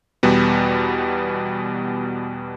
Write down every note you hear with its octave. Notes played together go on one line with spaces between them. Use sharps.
E2 B2 G3 B3